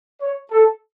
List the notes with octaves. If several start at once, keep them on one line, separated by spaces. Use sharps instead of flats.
C#5
A4